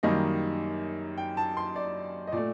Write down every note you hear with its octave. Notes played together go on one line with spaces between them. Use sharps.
F#2 D#3 G3 A#3 D#5
G5
A5
C6
D5
D#5
A#2 A3 D5